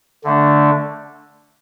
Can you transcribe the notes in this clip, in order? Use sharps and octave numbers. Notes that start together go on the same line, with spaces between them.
D3 A3 D4